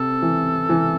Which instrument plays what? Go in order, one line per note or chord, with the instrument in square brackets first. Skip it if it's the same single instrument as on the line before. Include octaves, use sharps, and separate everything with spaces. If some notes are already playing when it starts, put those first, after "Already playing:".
Already playing: [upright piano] C3 [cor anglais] A4
[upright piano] E3
E3